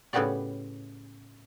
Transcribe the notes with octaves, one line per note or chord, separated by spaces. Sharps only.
A2 C#3 B3 F#4 G4 D5